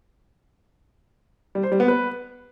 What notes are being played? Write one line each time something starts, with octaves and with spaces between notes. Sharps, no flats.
G3
C5
G3
B3
B4